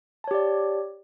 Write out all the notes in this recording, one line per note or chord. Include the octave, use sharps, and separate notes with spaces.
G4 C#5 D5 A5